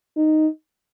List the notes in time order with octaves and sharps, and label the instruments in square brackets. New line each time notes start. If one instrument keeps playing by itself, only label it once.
[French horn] D#4